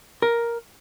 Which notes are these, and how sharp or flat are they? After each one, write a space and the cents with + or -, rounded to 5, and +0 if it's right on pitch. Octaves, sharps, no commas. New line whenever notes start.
A#4 +5